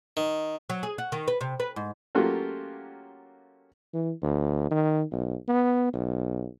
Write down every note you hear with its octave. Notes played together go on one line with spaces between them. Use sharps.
D#3
F#3
G#4
F#4
D#3
B4
C3
B4
G#2
F#3 A3 A#3 C#4 F4 G4
E3
D2
D#3
B1
B3
B1